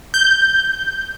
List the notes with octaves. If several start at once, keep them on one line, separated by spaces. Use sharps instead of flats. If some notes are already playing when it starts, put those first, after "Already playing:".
G6